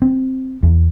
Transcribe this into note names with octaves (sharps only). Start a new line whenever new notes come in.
C4
E2